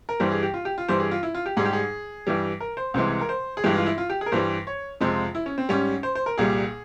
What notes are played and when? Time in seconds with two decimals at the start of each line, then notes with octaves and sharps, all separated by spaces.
0.09 A#4
0.20 G2 E3 G3 C5
0.31 G#4
0.43 G4
0.54 F4
0.65 G4
0.78 F4
0.88 G2 E3 G3 C5
1.00 G#4
1.11 F4
1.23 E4
1.35 F4
1.46 G4
1.57 G#2 G3 G#4
1.65 G4
1.73 G#4
2.27 G2 E3 G3
2.60 A#4
2.77 C5
2.94 C2 C3 E3 G#3 C5
3.21 A#4
3.29 C5
3.57 G#4
3.64 G2 E3 G#3 G4
3.75 F4
3.86 E4
3.98 F4
4.10 G4
4.21 G#4
4.26 A#4
4.32 G2 E3 G3 C5
4.67 C#5
5.01 F2 C3 F3 G#3 C5
5.35 E4
5.46 C#4
5.58 C4
5.69 G#2 G3 C#4
6.03 C5
6.15 C5
6.26 A#4
6.38 C2 A#2 G3 G#4